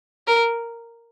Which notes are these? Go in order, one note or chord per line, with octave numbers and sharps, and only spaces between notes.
A#4